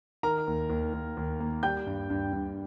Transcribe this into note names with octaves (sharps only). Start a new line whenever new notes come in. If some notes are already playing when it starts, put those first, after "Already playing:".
D#3 A#4 A#5
D#2
D#2
D#2
D#2
A#3
G3 G5 G6
G2
G2
G2